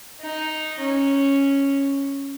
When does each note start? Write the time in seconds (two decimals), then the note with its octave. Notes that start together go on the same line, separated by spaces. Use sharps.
0.22 D#4
0.79 C#4